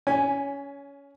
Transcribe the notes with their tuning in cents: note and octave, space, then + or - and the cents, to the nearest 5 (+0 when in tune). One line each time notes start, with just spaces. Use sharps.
C#4 +20 G#5 +0